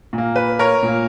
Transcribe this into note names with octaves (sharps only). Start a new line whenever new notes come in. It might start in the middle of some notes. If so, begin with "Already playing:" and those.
A#2
A#3
B4
A#4 C#5
A#2 A#3